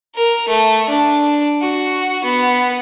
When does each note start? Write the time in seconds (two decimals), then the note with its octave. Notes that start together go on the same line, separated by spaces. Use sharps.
0.16 A#4
0.49 A3
0.89 D4
1.62 F#4
2.25 B3